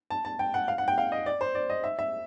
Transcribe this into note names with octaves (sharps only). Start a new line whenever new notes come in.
A5
A5
G5
F#5
F5
F#5
G5
F5
D#5
D5
C5
D5
D#5
E5
E5